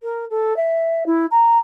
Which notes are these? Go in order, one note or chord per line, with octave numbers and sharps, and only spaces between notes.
A#4
A4
E5
E4
A#5